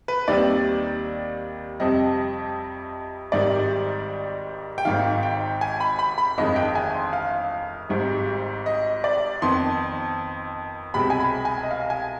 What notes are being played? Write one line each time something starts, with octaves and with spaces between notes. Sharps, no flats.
B4
D#2 D#3 G3 C4 D5
F2 C3 G3 C4 D#5
G#1 G#2 D#3 G3 D5
G5
G#1 G#2 D#3 F5
G5
G#5
B5
B5
B5
G1 F2 D#3 G#3 D#5
G5
G#5
C6
F5
G#1 G#2 G3
D#5
D5
F2 D#3 B3 C6
C2 B2 G#3 C4 B5
G#5
B5
G#5
D#5
F5
G#5